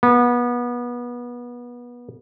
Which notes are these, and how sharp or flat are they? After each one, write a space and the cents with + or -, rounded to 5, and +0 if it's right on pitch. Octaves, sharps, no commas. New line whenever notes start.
B3 -25